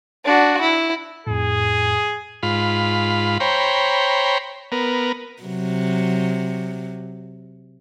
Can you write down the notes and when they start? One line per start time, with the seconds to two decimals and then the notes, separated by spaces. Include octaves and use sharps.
0.25 D4 F#4
0.61 E4
1.27 F2 A2 G#4
2.43 G#2 F4 B5
3.40 C5 C#5 G5 A#5 B5
4.72 B3 A#4
5.43 C3 F#3